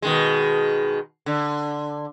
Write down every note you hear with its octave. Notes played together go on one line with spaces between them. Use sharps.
B2 D#3 G#3
D3